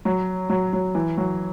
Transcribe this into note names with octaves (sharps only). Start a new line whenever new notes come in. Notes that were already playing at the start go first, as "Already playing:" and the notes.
F#3
F#3
F#3
E3
F#3